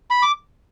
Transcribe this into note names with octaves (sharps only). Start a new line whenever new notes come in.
B5
D6